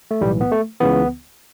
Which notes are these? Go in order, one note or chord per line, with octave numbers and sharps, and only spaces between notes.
A3
B1 A2 E3 G3
B3
A3
C#2 C#3 E3 B3